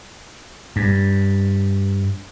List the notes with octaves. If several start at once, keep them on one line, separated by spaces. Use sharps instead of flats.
G2